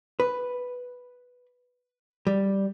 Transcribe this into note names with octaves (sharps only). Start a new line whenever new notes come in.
B4
G3